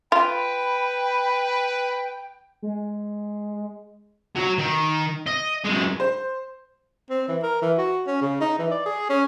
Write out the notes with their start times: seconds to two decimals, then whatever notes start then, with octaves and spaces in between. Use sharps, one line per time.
0.12 F4 B4 G5 B5
2.62 G#3
4.36 F#3 F#4
4.58 D#3
5.27 D#5
5.65 F#2 G#3
6.00 C5
7.10 C4
7.28 E3
7.43 A#4
7.62 E3
7.78 F#4
8.07 C#4
8.21 C#3
8.41 D#4
8.59 E3
8.71 D5
8.86 G#4
9.09 C#4